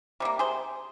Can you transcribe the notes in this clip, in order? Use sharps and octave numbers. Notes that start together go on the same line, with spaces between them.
C3 G3 A#3
G#4 C5